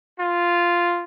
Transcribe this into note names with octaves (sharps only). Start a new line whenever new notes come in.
F4